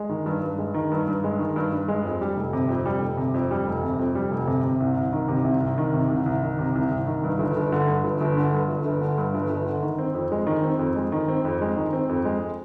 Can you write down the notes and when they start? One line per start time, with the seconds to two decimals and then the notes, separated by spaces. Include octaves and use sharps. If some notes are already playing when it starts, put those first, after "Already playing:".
Already playing: G#3
0.09 D#3
0.26 G2
0.42 G2
0.58 G#3
0.74 D#3
0.92 G2
1.07 G2
1.24 G#3
1.39 D#3
1.56 G2
1.73 G2
1.88 G#3
2.04 F2
2.21 G3
2.37 F1
2.53 C3
2.69 F2
2.86 G3
3.02 F1
3.17 C3
3.34 F2
3.51 G3
3.67 F1
3.83 C3
3.99 F2
4.15 G3
4.31 F1
4.47 C3
4.64 C3
4.80 C2
4.97 C2
5.13 D#3
5.28 C3
5.44 C2
5.60 C2
5.78 D#3
5.94 C3
6.10 C2
6.26 C2
6.42 D#3
6.59 C3
6.75 C2
6.91 C2
7.07 D#3
7.24 G2
7.39 G1
7.56 G1
7.72 D3
7.88 G2
8.04 G1
8.21 G1
8.37 D3
8.53 G2
8.68 G1
8.85 G1
9.01 D3
9.18 G2
9.34 G1
9.50 G1
9.66 D3
9.83 D#3
9.98 C4
10.15 F2
10.32 G#3
10.47 D#3
10.63 C4
10.79 F2
10.96 G#3
11.12 D#3
11.28 C4
11.45 F2
11.61 G#3
11.76 D#3
11.93 C4
12.09 F2
12.25 G#3